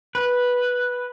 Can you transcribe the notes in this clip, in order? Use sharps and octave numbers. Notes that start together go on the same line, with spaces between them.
B4